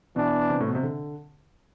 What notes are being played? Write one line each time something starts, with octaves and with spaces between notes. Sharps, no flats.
B2 E3 B3 D4
C3
A2
B2
C3
D3